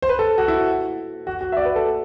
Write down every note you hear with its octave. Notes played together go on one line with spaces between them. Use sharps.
C5
B4
A4
F#4
E4
F#4
F#4
E5
D5
B4
A4